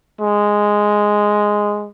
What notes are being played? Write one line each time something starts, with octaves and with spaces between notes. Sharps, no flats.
G#3